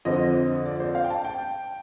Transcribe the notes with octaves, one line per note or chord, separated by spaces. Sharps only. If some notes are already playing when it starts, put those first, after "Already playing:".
F2 D3 F3 C4 D#5
D5
C5
F5
G5
A5
G5